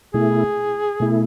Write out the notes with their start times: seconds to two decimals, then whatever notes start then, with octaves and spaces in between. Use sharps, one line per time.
0.14 B2 A3 E4 G#4
1.00 B2 A3 E4